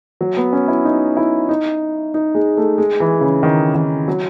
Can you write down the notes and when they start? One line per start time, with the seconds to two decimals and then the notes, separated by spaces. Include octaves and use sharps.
0.21 F#3
0.37 B3
0.53 C#4
0.68 E4
0.85 D#4
1.17 E4
1.49 D#4
2.14 D#4
2.35 G#3
2.57 A3
2.78 G#3
3.00 E3
3.21 C#3
3.43 D#3
3.75 D#3
4.08 F#3